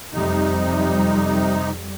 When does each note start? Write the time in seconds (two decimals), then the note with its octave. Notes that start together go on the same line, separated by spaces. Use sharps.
0.13 F2 C3 G3 D#4